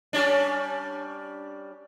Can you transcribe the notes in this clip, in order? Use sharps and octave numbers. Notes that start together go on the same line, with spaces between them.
G3 C#4 D4